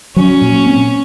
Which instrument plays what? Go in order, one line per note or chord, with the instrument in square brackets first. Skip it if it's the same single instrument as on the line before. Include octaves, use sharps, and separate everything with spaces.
[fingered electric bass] F#3 [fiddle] C#4
[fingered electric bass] A#2
C4